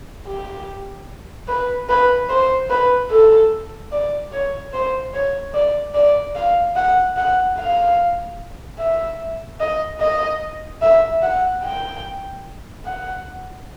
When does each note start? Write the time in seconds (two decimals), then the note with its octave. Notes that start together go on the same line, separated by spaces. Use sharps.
0.27 G4
1.48 B4
1.89 B4
2.29 C5
2.70 B4
3.11 A4
3.92 D5
4.32 C#5
4.73 C5
5.14 C#5
5.54 D5
5.95 D5
6.36 F5
6.76 F#5
7.17 F#5
7.57 F5
8.79 E5
9.60 D#5
10.01 D#5
10.82 E5
11.22 F#5
11.63 G5
12.85 F#5